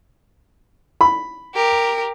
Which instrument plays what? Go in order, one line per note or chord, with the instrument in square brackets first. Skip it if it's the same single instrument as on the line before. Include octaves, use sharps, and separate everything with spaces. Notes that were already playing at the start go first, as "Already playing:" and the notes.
[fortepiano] B5
[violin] G4 A#4